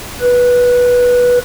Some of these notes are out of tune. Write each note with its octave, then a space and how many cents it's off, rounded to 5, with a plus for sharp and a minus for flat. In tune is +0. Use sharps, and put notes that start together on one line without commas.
B4 -10